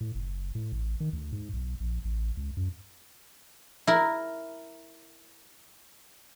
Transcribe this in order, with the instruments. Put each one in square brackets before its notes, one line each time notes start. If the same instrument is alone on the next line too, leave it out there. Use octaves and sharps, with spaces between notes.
[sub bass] A2
F#1
A2
A1
D#3
D2
G#2
B1
A#1
A1
C#2
F#2
[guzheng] E4 A#4